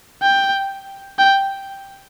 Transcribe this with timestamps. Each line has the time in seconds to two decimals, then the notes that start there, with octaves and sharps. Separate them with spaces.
0.22 G5
1.19 G5